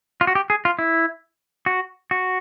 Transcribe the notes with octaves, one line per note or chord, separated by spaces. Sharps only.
F4
F#4
G4
G#4
F4
E4
F#4
F#4